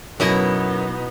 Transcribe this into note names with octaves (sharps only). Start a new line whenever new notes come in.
F#2 B2 B3 D#4 E4 A4 D#5 G#5